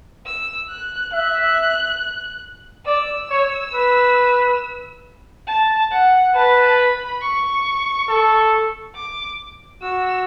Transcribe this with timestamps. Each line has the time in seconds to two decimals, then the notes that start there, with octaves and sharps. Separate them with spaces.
0.26 E6
0.70 F#6
1.13 E5 F#6
2.87 D5 E6
3.30 C#5
3.74 B4
5.48 A5
5.91 F#5
6.35 B4 A5
6.78 B5
7.21 C#6
8.09 A4
8.95 D6
9.82 F#4 E6